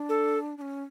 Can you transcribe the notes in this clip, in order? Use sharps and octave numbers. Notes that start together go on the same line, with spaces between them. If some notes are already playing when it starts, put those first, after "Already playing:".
Already playing: D4
A4
D4
C#4